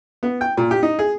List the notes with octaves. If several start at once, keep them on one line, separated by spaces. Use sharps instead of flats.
B3
G5
A#2
G4
D#4
G#4